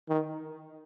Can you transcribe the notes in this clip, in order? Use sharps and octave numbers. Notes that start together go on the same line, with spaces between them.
D#3